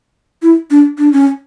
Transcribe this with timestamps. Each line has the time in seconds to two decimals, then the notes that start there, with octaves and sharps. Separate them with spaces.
0.42 E4
0.71 D4
0.98 D4
1.12 C#4